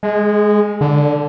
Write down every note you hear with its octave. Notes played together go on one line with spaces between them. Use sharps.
G#3
D3